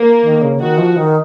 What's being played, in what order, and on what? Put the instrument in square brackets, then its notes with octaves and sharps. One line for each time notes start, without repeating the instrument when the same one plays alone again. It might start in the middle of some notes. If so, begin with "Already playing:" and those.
Already playing: [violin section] A#3
[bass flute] D#3
C#3
[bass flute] D#3 [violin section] F#4
[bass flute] F3
D#3